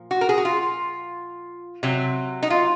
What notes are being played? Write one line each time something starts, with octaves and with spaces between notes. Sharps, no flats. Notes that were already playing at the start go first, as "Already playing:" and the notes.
Already playing: A#2 F3
F#4
A#4
G#4
F#4
F4
C3 F#3
D#4
F4